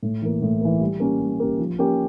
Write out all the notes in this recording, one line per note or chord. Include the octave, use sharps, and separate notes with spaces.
A2
E3 A#3
A2
E3 A#3
G3
A#3 C#4 G4 A#4
G3
A#3 C#4 G4 A#4
F3
A#3 C#4 G4